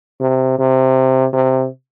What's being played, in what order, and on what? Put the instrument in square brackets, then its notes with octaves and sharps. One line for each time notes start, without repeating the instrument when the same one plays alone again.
[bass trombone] C3
C3
C3